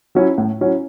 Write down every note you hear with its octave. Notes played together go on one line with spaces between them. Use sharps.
F#3 C#4 E4
A2
F#3 C#4 E4